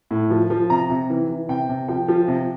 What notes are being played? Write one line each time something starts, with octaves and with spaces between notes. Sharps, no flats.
A2
F3
F3
C3 A#5
C3
E3
E3
C3 G5
C3
F3 G5
F3
C3